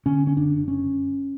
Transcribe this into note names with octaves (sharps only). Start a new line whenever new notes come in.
D3 C#4
C#4
F#1 D4
C#4